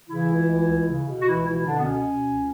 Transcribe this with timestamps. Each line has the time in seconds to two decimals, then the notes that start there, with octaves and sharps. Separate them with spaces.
0.09 C#3 E3 E4
0.29 C#2
0.49 C#2
0.69 C#2
0.88 C#3
1.07 B2
1.21 F#4
1.27 C#2 E3 E4
1.46 B2 E3 E4
1.65 B2 D3 D4
1.78 B3
1.85 C#2 C#4
2.05 B2
2.24 C#2